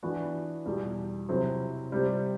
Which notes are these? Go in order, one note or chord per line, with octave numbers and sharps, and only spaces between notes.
E3 B3 D4 F#4 B4
E2 B2 G3
C3 F#3 C4 E4
C3 G3 C4